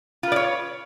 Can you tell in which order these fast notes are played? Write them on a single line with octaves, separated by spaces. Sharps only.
F4 B4 D5 C#5